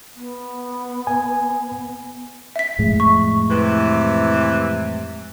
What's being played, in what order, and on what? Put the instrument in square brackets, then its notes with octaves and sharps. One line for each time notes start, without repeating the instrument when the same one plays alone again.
[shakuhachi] B3
[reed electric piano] G#5
[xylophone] E5 B6
[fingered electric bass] F2 A2 G#3
[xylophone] C#6
[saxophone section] C3 E3